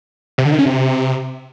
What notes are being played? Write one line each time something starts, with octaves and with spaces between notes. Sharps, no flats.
C3
D3
D#3
C#4
C3